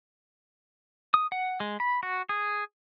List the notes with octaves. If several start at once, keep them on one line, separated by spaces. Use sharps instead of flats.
D#6
F#5
G#3
B5
F#4
G#4